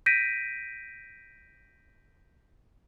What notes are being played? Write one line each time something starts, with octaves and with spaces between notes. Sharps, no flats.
G6 A#6 B6 D7 D#7